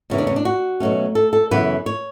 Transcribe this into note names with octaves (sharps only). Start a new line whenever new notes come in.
E2 C#3 E3
D4
C#4
D4
F#4
B2 F#3 A3 C#4
A4
A4
F#2 C#3 E3 B3 B4
C#5